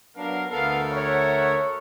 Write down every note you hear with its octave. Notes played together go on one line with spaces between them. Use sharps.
F#3 B3 D4 A#4 F5
D2 B3 A4 A#4 F5
C#5 E5 F#5